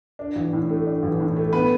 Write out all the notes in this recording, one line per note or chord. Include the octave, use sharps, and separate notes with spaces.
D4
A1
A2
A3
D4
A1
A2
A3
B3 B4